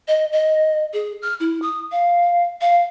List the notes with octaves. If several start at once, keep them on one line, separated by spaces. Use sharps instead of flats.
D#5
D#5
G#4
F6
E4
D#6
F5
F5